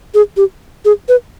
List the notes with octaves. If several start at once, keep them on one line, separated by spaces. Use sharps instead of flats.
G#4
G4
G#4
B4